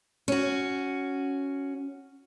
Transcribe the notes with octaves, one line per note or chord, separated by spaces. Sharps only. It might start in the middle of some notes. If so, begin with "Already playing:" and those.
C#4 F#4